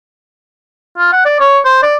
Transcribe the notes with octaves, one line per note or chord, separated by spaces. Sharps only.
F4
F#5
D5
C#5
C5
D5